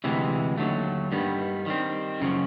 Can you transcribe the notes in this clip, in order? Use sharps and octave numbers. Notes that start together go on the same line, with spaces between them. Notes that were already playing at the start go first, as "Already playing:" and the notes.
D2 C3 E3 G#3
D#2 D3 F#3 A3
G2 D#3 G3 B3
D#3 G3 C4
F#2 C#3 F3